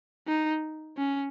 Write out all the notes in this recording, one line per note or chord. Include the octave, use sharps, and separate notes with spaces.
D#4
C#4